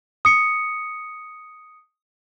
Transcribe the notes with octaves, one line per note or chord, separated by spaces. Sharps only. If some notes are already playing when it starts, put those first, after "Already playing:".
D#6 C#7